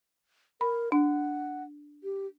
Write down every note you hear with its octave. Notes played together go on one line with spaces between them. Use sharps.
A#4 B5
D4 F#5
G4